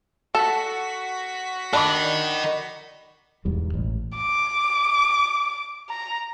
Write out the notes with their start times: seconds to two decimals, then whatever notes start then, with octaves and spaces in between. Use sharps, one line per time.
0.35 F#4 A4 B6
1.73 D4 A#4 D5 D#5 B5 D6
3.45 E1 E2 G#2 G3
3.74 A1
4.17 D6
5.90 A#5